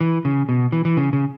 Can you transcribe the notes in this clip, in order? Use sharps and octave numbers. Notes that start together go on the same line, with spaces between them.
E3
C#3
B2
E3
E3
C#3
C#3